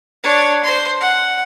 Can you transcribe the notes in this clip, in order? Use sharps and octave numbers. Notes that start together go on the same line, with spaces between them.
D4 C#5
C5 C6
F#5